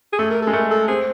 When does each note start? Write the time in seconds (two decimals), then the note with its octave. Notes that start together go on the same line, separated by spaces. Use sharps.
0.13 G#4
0.19 A3 A4
0.30 A#4
0.42 A4
0.47 G#3
0.53 A3 A#4
0.71 A4
0.88 C4 G#4